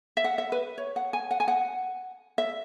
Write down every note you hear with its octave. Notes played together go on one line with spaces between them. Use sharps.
E5
F#5
E5
B4
C#5
F#5
G#5
F#5
G#5
F#5
E5